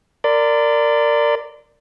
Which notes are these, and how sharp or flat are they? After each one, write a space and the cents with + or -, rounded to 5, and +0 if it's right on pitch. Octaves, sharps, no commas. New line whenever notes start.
A#4 -15 D5 +0 C6 -45